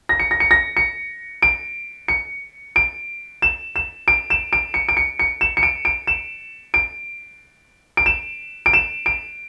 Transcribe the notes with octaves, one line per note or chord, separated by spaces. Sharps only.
A#6
C#7
A#6
C#7
A#6
C#7
D7
C#7
D7
E7
E7
D7
E7
D7
C#7
D7
C#7
C#7
E7
C#7
D7
D7
E7
D7
D7
E7
D7
E7
D7